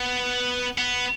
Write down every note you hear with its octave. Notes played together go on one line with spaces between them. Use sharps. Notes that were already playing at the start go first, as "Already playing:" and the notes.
Already playing: B3
B3